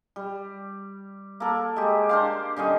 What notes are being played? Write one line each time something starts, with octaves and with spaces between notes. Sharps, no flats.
G3
A#3 A4
G#3 G4
D4 C5 F5
D3 G3 C#4 D#5